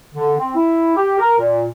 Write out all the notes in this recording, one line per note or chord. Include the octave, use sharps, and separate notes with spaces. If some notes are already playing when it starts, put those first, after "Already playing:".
D3
C4
E4
G4
A#4
A#2